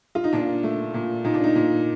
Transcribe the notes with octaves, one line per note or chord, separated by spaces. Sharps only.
F4
D#4
A#2 D4
A3
A#2
A#2 D#4
D4
D#4
A#2